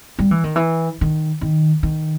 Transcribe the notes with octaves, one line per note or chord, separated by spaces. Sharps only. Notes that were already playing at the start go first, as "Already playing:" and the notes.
G3
E3
D#3
E3
D#3
D#3
D#3